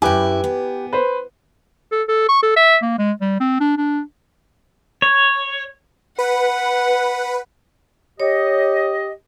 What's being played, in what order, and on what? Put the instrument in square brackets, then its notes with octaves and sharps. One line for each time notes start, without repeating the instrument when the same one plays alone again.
[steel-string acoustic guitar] F#2 E4 [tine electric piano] G4 B4 G5 [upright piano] G#5 D6
[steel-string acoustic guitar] B3
[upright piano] B4 C5
[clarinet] A4
A4
C#6
A4
E5
A#3
G#3
G3
C4
D4
D4
[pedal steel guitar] C#5
[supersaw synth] B4 [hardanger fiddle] F#5
[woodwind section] G4 D#5 [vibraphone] C#5